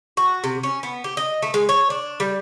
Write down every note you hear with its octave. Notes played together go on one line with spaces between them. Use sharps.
F#4
C3
C#4
B3
G4
D#5
A3
G#3
C#5
D4
G3